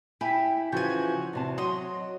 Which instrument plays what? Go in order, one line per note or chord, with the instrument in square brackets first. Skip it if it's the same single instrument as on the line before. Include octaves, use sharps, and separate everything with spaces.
[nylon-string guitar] E4 E5 G#5 [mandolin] G4 B5
[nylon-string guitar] C#3 E3 F3 [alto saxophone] F#4 [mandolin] G#5 G6
[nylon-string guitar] E2 C3 A5
[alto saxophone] F#3 [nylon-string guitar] D#5 F#5 [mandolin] C6 D#6